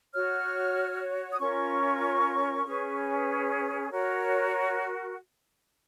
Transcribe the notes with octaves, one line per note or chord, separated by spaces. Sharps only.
F#4 C#5 F6
D#6
C#4 F4 A#4 C#5 C#6
C#4 G#4 B4
F#4 A#4 C#5